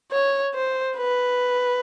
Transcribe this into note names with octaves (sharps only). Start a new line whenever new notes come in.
C#5
C5
B4